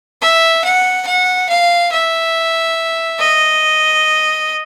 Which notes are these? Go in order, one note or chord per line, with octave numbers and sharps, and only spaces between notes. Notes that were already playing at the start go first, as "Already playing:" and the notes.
E5
F#5
F#5
F5
E5
D#5